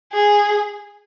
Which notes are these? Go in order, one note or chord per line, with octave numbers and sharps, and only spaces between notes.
G#4